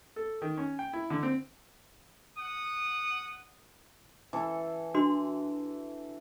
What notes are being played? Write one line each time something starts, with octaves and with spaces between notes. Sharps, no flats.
A4
D#3
C#4
G5
E4
D3
C4
F#5 D#6
E3 A4
D4 F#4 C6